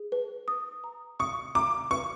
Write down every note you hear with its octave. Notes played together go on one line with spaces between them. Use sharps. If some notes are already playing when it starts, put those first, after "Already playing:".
Already playing: G#4
B4
D#6
A#5
C#6 D#6
A#5 D6
B4 C#6